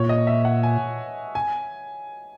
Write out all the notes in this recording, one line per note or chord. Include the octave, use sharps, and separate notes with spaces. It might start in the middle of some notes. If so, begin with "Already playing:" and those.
Already playing: A#2 C#5
D#5
E5
F#5
G#5
G#5